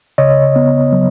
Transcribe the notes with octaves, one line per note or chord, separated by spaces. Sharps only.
C#3 C#5 D#5
B3
F#3